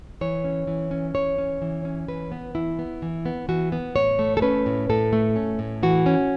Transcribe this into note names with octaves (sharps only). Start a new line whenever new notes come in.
E3 C#5
C#4
E3
C#4
E3 C#5
C#4
E3
C#4
E3 B4
B3
E3 E4
B3
E3
B3
E3 F#4
B3
A2 C#5
A3
A4
C#4 B4
A2
A2 A4
A3
C#4
A2
E3 F#4
C#4